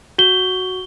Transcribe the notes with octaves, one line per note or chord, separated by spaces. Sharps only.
F#4 G7